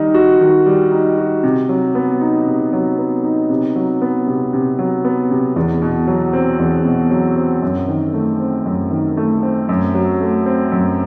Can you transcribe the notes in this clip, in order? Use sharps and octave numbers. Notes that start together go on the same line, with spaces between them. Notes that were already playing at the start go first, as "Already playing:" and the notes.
Already playing: D#3 G3 D#4
F#4
D#3
G3
D#4
F#4
C3
F#3
B3
D#4
C3
F#3
B3
D#4
C3
F#3
B3
C3
C3
F#3
B3
C3
E2
B2
F#3
C4
E2
B2
F#3
C4
F#2
D#3
A3
C4
F#2
D#3
A3
C4
F#2
F#3
A3
C4
F#2